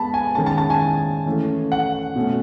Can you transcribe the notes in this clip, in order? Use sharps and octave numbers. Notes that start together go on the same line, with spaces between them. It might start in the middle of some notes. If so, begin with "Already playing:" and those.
Already playing: G#3 B3 A5 B5
G#5
D#3 G#3 C#4 A5
A5
A5
G#5
E3 A3 C#4
F#5
B2 A3 C#4